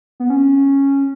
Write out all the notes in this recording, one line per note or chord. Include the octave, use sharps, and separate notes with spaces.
B3
C#4